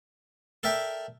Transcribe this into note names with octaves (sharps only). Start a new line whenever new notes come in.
A4 A#4 D5 E5 G5